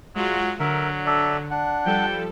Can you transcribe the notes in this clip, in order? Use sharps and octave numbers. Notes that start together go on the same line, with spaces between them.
F#3 G#3 F4 F#4
D3 F#3 A#4 E5
A4 D5 E5
D4 F#5
F3 G3 A4 G5